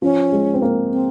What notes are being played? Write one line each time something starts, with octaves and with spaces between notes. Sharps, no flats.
F3 C#4
G#3
C4
A#3
C4